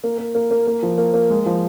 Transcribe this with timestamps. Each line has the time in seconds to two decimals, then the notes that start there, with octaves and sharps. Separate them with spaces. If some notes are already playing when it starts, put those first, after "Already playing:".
0.04 A#3
0.18 A#3
0.35 A#3
0.51 A#3
0.67 A#3
0.83 F3
0.98 A#3
1.14 A#3
1.30 G#3
1.46 F3